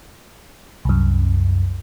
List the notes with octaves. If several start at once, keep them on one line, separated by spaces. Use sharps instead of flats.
C2 F#2